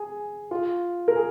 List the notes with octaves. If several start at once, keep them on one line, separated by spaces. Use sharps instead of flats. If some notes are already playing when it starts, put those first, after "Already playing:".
Already playing: G#4
F4
A#4
G#4